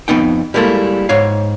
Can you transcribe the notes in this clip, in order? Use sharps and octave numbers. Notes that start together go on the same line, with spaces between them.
F2 B3 D#4 G5
G3 G#3 A#3 E4 A4
G#2 C#5 F5